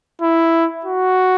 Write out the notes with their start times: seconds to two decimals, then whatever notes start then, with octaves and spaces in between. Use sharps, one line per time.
0.21 E4
0.85 F#4